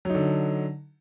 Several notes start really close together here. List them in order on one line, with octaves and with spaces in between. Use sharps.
F#3 D#4 D3